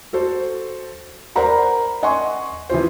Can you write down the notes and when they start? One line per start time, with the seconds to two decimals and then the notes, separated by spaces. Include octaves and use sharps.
0.13 F#4 A4 C5
1.36 A#4 C5 D5 F#5 A#5 B5
2.03 D#5 F#5 G#5 C6 C#6
2.69 E3 F3 F4 C5